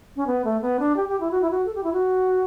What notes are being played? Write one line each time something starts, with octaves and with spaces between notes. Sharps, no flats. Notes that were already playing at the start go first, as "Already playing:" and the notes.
C#4
B3
A3
B3
D4
G4
G4
E4
F#4
E4
F#4
A4
G4
E4
F#4